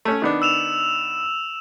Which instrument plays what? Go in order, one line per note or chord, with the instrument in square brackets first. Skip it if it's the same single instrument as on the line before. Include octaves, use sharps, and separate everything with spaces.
[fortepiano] A3 C#4
D#3 B3 D4
[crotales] E6 E7 F7